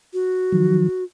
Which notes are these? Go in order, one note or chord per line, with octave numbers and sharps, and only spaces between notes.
F#4
D#3 F3 F#3